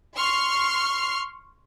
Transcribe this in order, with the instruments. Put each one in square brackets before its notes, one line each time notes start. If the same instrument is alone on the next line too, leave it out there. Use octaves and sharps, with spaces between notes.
[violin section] C6 C#6 F6 C7